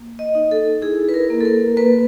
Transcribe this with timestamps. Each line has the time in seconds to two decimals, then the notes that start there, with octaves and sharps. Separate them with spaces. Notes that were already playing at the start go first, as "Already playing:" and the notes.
Already playing: A#3
0.19 D#5
0.35 D#4
0.51 A4
0.82 E4 G#4
1.09 B4
1.14 A#4
1.30 A#3
1.41 A4
1.45 A#4
1.77 A#3 B4